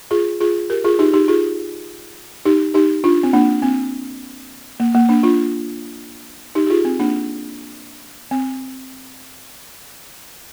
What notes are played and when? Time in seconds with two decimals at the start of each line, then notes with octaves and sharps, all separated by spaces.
0.11 F4 G#4
0.40 F4 G#4
0.70 G4 A#4
0.84 F4 G#4
0.99 D#4 G4
1.13 D#4 G4
1.28 F4 G#4
2.45 D#4 G4
2.74 D#4 G4
3.04 D4 F4
3.23 C4
3.33 A#3 D4
3.62 C4
4.80 A#3
4.95 A#3
5.09 A#3 D4
5.23 D4 F4
6.55 D#4 G4
6.66 G4
6.70 F4 G#4
6.85 C4
6.99 A#3 D4
8.31 C4